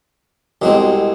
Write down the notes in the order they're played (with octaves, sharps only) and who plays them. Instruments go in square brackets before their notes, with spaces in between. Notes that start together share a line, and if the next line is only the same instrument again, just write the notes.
[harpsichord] C2 B2 G#3 C4